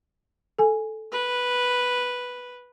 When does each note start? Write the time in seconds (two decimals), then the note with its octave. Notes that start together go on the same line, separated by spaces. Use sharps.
0.59 A4 G#5
1.12 B4